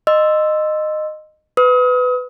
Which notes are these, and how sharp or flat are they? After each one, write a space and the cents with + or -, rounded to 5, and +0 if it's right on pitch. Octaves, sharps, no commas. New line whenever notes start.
D#5 -15 C6 +0 E6 +0
B4 +15 D#6 +35